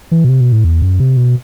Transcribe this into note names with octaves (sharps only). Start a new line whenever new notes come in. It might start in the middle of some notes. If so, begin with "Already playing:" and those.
E3
B2
C3
B2
A2
E2
F#2
C3
B2